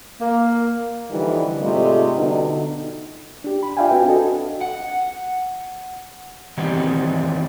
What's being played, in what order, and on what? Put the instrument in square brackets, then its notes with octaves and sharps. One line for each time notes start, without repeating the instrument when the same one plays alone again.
[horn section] A#3
[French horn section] D3 E3 F3 G3 D#4
G#2 C3 G3 A3 F4 D#5
B2 D3 D#4
[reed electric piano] D4 G4
B5
F4 D5 E5 F5 G5 G#5
C4 F#4 B4 G5 G#5
D4 F#4 A4 D#5
[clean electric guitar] F#5
D#3 E3 G3 B3 C4 D#4